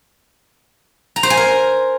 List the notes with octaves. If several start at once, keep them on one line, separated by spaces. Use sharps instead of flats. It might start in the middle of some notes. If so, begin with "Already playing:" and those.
A#5
C5
G#5
A#4